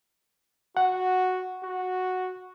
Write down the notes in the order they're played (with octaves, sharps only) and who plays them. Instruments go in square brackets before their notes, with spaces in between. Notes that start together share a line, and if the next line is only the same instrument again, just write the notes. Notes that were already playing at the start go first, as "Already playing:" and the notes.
[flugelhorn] F#4 [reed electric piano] F#5
[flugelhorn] F#4